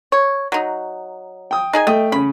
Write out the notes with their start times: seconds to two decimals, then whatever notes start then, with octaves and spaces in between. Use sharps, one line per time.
0.12 C#5
0.52 F#3 D#4
1.51 G5 D#6
1.73 D#4 G#4 G#5
1.87 A3 D#5 G5
2.12 C#3 C#4 B5